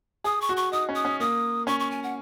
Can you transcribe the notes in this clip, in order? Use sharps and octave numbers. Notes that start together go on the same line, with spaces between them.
G#4 D#6
C#6
F#4
C#6
D#4 D#6
C#4
D#6
C#4
A#3 D#6
C#4 C#6
C#6
G#5
F#5